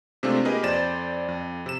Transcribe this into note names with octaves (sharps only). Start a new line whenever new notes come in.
C3 G#3 A3 C4 D4 F4
A#3 G4 G#4 A#4 B4 D#5
F2 C5 D5 A6 E7
F2
C3 E7